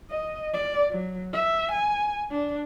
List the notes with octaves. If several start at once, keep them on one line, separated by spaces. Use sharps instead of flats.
D#5
D5
F#3
E5
G#5
D4